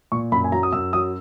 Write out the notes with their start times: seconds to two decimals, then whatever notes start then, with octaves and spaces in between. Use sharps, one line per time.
0.12 A#2 C#6
0.32 F#2 B5
0.44 G#5
0.52 F#3 A#5
0.63 D#6
0.73 F#2 E6
0.93 F#3 D#6